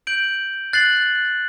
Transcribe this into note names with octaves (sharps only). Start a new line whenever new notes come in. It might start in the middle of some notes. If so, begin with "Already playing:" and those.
G6 D7 F#7
F#6 A6 C7 F#7